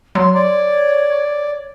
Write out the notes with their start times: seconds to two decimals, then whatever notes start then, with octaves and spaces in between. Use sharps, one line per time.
0.15 F#3 C6
0.35 C#5 D5